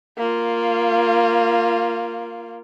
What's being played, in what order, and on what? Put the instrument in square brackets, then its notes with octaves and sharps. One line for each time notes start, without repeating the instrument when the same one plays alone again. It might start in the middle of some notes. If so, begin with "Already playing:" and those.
[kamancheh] A#3 F4